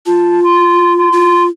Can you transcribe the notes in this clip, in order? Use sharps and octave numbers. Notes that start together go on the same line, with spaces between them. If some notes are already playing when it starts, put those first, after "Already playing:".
F4 A5
C6
C6
F4